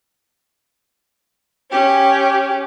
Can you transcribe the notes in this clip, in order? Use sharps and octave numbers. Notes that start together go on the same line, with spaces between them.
C#4 G4